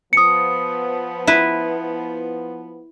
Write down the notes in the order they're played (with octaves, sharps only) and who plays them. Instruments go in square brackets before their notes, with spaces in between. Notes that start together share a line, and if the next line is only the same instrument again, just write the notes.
[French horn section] F3 B3 [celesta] D#6 C#7
[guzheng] E4 B4